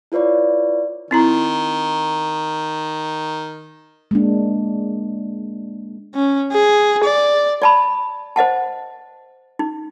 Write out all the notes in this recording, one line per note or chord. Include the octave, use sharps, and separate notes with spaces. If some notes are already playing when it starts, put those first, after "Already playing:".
E4 F4 B4 C#5 D5
D#3 C4 E4 A#5
G#3 A#3 D4
C#4
G#4
D5
D5 A5 B5
C5 D#5 F#5 A5
D#4